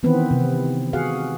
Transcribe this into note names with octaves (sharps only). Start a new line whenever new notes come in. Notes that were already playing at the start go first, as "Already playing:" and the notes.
D#3 E3 B3 C4 B4
C3
F#4 G#4 F5 F#5